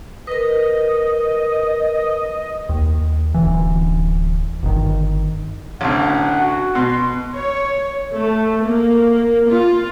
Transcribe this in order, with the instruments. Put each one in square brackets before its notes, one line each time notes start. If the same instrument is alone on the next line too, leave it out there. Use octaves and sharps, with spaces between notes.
[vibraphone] A#4 B4 [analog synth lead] D#5
[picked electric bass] D#2
D1 G#1 E3
G1 D#3
[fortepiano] A1 D2 [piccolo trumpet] F#5
[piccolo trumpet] F#4
[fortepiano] B2 [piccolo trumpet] C6
[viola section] C#5
A3
A#3
F4